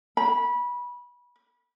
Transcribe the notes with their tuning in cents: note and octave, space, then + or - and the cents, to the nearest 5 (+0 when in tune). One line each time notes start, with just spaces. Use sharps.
B5 -20